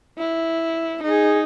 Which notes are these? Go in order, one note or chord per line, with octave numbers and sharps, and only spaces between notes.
E4
D#4 G#4